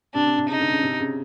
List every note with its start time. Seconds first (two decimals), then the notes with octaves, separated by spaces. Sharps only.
0.14 C3 D4
0.26 C3
0.38 C3
0.49 C#3 D#4
0.61 D3
0.72 C#3
0.83 C3
1.00 C#3